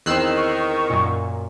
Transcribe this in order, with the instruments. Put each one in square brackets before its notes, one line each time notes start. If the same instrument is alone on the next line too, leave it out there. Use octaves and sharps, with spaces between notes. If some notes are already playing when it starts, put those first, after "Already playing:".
[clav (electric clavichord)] E2 C4 [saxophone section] D#3 [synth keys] E6 F#6 C7
[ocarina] C#6
[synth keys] F#2 A#2